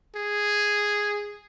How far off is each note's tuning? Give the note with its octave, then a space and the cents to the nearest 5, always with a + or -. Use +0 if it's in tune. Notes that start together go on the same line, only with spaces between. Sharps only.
G#4 -5